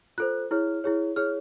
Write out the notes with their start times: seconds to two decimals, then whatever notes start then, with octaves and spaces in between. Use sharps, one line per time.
0.18 F4 A4 C5 F#6
0.51 E4 G#4 C#5 F6
0.84 E4 G#4 C#5
1.16 E4 G#4 C#5 F6